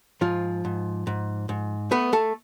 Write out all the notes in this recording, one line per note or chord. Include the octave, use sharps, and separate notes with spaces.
G#2 F3 F4
G#2
G#2
G#2
A3 B3 B4
A3 A4